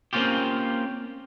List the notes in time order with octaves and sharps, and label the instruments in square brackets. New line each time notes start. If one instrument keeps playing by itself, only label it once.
[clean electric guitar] A#3 C4 C#4 F4 G4